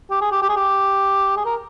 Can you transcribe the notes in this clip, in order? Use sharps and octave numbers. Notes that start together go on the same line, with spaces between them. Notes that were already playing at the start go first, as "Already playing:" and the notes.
G4
G#4
G4
G4
G#4
G4
G#4
A#4